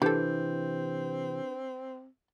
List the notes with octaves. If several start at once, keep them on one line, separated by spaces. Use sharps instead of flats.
C3 E3 C4 D4 G4 A4 B4 G6